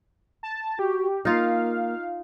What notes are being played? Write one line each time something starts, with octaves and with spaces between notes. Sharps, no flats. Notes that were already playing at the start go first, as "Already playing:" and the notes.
A5
F#4 G4
A#3 D#4 F4 F5